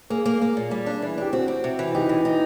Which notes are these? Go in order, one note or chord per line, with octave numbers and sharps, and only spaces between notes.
A#3 G#4
A#3
A#3
A#2
G3
D4
E3
D4 G4
C4 F#4
C4
C3
E3
D#4 G4
E3
D#4